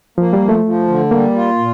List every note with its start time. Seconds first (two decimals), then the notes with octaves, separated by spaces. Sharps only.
0.18 F3 A#3
0.33 G3
0.41 F3
0.49 A3
0.64 F3
0.88 D3
1.11 G3 A#3
1.35 F4
1.58 A#2